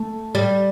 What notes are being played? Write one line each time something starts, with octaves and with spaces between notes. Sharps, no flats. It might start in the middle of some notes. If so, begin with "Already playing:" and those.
Already playing: A3
G3